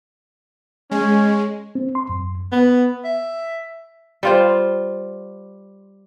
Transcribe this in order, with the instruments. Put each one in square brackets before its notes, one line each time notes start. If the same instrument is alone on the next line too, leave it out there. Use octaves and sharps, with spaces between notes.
[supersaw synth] G#3 [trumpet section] C#4
[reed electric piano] C4
C6
F#2
[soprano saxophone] B3
E5
[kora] G3 F4 C5